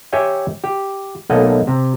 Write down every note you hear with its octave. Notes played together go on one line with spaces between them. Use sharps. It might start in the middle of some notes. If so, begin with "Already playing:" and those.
G4 C#5 E5 G5 G#5
G4
B1 A3 A#3 D#5 F#5
C3